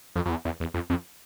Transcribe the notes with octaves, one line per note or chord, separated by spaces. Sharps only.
F2
F2
E2
E2
E2
F2
F2